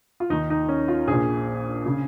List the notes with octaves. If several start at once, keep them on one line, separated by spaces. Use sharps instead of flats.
F4
D#2 D#3 D#4
D#4
C#4
F4
A#1 A#2 G#4
C#3